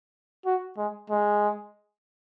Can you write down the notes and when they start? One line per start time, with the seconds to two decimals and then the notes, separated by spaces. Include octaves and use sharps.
0.46 F#4
0.78 G#3
1.10 G#3